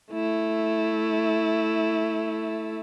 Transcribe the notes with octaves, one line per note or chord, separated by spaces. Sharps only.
A3 E4